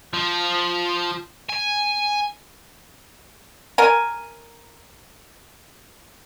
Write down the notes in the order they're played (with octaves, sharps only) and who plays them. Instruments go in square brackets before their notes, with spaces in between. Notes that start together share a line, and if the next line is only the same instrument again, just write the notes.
[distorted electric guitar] F3
G#5
[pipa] A#4 G#5